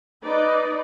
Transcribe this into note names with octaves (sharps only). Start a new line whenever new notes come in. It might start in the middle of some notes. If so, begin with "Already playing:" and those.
D#4 B4 D5 D#5